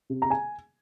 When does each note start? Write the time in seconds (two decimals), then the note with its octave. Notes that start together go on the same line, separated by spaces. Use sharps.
0.10 C3
0.22 A#5
0.30 G#5